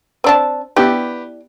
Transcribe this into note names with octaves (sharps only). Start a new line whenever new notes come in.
C4 D4 A5
B3 D4 E4 G4 G5